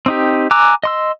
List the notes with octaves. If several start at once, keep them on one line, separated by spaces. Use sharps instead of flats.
C4 D#4 G4
G#5 A#5 D6 E6 F#6
D#5 C6 E6